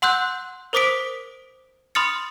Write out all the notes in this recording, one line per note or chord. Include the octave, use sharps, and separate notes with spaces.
F#5 C6 E6 F#6 G6
A#4 C5 D6 D#6 B6 D7
B5 C6 D#6 F6 A6 C#7